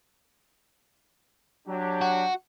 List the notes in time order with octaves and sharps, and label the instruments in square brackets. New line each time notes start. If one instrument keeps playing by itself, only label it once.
[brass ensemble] F#3 D4 G4
[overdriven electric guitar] F#4